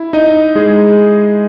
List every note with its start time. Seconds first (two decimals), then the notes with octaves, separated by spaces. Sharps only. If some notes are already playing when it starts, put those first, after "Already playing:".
Already playing: E4
0.13 D#4 D#5
0.55 G#3 G#4